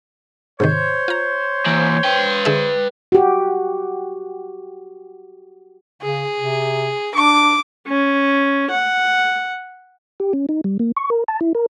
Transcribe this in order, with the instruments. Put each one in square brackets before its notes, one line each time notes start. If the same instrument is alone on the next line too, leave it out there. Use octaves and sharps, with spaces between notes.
[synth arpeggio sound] G#2 C3 D#3 [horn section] C5 C#5
[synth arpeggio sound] F4 A#5
[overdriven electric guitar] E3 A#3
B4 G5
[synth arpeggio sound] D3 G#4 E5
[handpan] F#4 G4
[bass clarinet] C#3 [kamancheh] G#4
[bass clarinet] C3
[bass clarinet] D4 [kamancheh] D6
[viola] C#4
F#5
[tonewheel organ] G4
C#4
D#4
G3
A#3
C#6
A#4
A5
E4
A#4